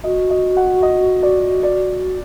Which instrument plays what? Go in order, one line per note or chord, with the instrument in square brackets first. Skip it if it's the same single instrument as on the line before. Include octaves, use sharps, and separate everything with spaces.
[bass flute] F#4 [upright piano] D#5
[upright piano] D#5
F#5
D#5
D5
D5